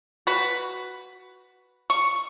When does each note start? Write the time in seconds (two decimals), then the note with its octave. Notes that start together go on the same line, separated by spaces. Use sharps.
0.27 F#4 B4
1.90 C#6